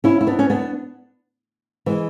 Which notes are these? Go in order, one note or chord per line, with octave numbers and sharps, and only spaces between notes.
C#4 E4
E4
B3 D4
C#4
B3 D4
E3 G#3